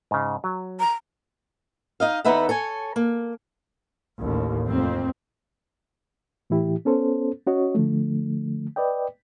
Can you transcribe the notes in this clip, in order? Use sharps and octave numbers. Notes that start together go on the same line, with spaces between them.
G#2 C#3
F#3
A#5
D#4 D#5 F5
E2 D#4 A4 B4 E5 F#5
A4 C#5 G#5
A#3
A1 D#2
F1 F2 C4
A2 E3 E4 G4
B3 C#4 A4 C5
C#4 F#4 C#5 D#5
D3 F3 A3
B4 D5 D#5 G5